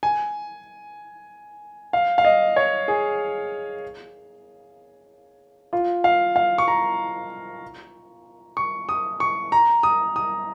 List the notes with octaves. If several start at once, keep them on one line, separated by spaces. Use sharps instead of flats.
G#5
F5
F5
D#5
C#5
G#4
F4
F5
F5
C#6
A#5
C#6
D#6
C#6
A#5
D#6
D#6